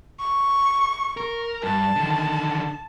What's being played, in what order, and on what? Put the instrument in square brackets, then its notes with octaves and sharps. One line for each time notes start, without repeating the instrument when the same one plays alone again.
[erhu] C#6
[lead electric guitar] A#4
[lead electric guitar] G2 [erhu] A5
[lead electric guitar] D3 D#3